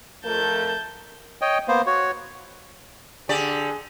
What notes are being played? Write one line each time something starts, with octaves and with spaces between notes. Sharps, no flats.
F2 A3 A#4 A5 G6
C#5 D#5 G5
A#3 B3 C5
F#4 C#5
D3 G4 G#4 D5